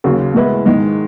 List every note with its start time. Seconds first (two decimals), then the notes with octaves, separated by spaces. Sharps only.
0.04 D#2 C#3 F#3
0.34 A2 G#3 B3 E4
0.66 G#2 D#3 G#3